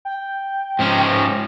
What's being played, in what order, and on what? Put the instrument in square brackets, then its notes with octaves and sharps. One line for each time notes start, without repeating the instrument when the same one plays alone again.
[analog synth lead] G5
[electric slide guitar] G#2 F3 C#4